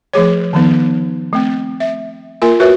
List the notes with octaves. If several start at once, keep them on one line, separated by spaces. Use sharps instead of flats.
F3 A3 G#4 C#5
D#3 F3 B3 D#4
A3 C4
E5
A#3 F4 A#4 G#5
F#4 A#4 B4 C#5 E5